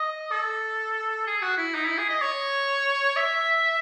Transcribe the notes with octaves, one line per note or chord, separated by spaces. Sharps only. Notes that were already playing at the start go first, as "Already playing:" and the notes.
Already playing: D#5
A4
G#4
F#4
E4
D#4
E4
G#4
D#5
C#5
E5